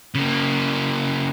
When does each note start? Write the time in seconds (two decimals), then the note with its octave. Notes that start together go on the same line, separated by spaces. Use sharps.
0.15 C#3 A#3